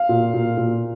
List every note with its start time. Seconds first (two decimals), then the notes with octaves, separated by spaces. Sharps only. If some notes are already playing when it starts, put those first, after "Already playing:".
Already playing: F5
0.09 A#2
0.34 A#2
0.57 A#2